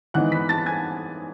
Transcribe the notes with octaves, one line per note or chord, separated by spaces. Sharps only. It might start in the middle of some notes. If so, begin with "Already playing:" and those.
G#2 E3 B3 D#4 F#5 F#6
B5 B6
A5 A6
G#5 G#6